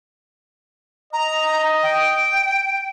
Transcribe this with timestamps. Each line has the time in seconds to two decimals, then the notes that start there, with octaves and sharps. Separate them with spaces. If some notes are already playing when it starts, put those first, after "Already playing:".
1.13 D#5 A#5
1.83 G5